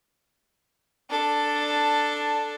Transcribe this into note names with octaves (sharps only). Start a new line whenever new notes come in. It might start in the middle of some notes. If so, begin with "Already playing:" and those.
D4 A4